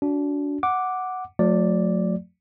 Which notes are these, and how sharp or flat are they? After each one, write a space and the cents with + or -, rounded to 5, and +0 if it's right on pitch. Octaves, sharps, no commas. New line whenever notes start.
D4 -30 F#4 -5
F#5 +0 D6 +0
F#3 -45 A3 +0 D5 +0